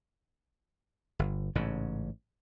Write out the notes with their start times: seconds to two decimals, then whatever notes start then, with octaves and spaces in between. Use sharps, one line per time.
1.19 G1
1.55 A1 G#2 C#3